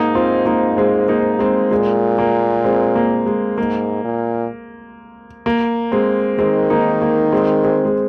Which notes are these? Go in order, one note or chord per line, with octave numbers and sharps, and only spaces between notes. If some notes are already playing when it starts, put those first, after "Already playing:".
Already playing: G#2 A#3 D#4
C4 F4
A#3 D#4
G#3 C4
A#3 D#4
G#3 C4
A#2 G#3
A#3
G#3 C4
A#3
G#3
G#2 A#3
A#2
A#3
G#3 C4
D#3 G#3 C4
A#3 D#4
A#3
G#3 C4
G#3 C4
G#3